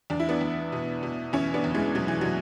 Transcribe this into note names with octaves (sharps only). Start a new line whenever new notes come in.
E2 D4
E4
B3 D4
E2
B2
B2
E2 C#4 E4
B3 D4
E2
E3 G#3
B2 F#3
E3
B2 F#3